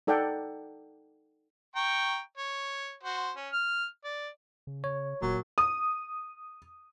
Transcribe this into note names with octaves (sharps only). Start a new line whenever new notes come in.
D#4 A4 D5 F#5 G5
G5 A#5 C#6
C#5
F#4 C5
C#4
F6
D5
C#3
C#5
D#1 A#2 F#3
D#6